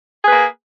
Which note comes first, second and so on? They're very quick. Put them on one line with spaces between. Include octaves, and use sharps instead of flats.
G#4 B4 A#3